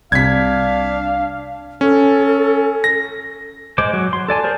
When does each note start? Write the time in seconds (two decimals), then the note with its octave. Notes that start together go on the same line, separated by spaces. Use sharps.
0.12 C2 C3 D4 F5 G#6 B6
1.81 C#4 A4
2.84 A#6
3.78 G#3 C5 D6
3.94 F#3
4.13 C6
4.28 A4 D5 G#5 A5
4.43 G#4 A#4 C5 A5